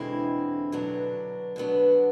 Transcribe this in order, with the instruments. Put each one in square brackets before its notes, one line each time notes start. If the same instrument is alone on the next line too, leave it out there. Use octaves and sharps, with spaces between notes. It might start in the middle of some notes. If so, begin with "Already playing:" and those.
Already playing: [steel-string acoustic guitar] E2 B2 G#3 C4 E4 [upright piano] D3
[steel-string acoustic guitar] B2 F#3 B3 D4
B2 F#3 B3 D4